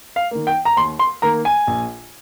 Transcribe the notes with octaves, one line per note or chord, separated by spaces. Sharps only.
F5
D#3 A#3
G5
A#5
D#2 C6
C6
D#3 A#3 A#5
G#5
A#1